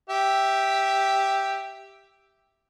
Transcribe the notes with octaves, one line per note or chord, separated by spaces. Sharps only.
G4 E5